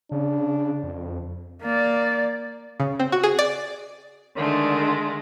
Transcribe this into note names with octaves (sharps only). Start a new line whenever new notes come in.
C#3 D4
F2
A#3 D5
C#3
C4
F#4
G#4
D5
D3 D#3 G#3 A3